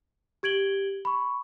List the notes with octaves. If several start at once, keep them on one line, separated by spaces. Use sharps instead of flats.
G4 G#6 D7 F#7 G7
B5 C#6